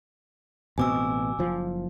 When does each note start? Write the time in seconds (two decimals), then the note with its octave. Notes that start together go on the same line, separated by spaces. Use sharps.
0.78 A1 B2 C4 G#5 D6 E6
1.39 F#1 F3